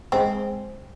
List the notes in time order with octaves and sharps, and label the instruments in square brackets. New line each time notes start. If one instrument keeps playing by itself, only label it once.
[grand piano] G#3 [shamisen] C4